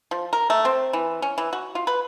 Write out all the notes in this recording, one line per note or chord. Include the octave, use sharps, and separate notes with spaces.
F3
A#4
A3
C4
E3
C#4
E3
F#4
F4
B4